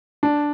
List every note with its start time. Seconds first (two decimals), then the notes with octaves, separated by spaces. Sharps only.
0.23 D4